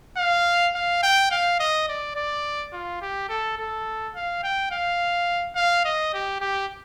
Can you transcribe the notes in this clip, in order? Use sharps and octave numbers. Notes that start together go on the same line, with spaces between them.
F5
F5
G5
F5
D#5
D5
D5
F4
G4
A4
A4
F5
G5
F5
F5
D#5
G4
G4